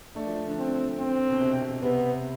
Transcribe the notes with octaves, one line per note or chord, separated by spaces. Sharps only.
A3 D4
F3
D3
C4
C4
B2
C3
C3
C3 B3